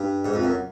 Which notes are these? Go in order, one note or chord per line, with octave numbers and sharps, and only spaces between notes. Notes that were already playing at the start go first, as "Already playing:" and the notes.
Already playing: G2
G#2
F2
F#2